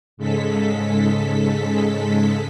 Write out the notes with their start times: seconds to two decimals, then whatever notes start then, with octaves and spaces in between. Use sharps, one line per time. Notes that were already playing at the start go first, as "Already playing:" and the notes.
0.17 G#2 C#3 G#3 A4 B6